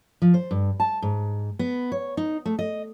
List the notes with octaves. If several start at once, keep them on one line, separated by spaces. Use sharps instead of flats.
F3
C5
G2
A5
G#2
B3
C#5
D#4
A3
D#5